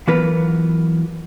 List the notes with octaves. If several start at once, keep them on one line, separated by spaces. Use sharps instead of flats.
E3 F#3 B3 F4 A#4 B4